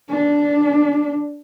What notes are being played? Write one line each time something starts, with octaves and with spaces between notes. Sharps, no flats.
D4